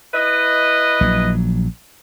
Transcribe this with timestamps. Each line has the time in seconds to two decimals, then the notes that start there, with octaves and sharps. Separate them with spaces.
0.14 E4 B4 D#5
1.01 A#1 F#3